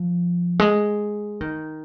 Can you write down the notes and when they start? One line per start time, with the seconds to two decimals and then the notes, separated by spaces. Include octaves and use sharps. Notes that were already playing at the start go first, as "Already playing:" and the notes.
Already playing: F3
0.59 G#3
1.41 D#3